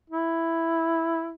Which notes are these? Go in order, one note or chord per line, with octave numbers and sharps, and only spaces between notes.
E4